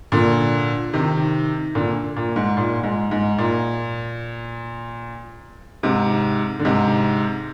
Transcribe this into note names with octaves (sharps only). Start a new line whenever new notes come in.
A#2 D3
C3 D#3
A#2 D3
A#2
G#2
A#2
G#2
G#2
A#2
G#2 C3
D3
G#2 C3